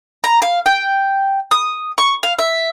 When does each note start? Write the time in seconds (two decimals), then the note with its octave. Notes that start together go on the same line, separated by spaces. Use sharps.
0.24 A#5
0.42 F5
0.66 G5
1.51 D#6
1.98 C#6
2.23 F5
2.39 E5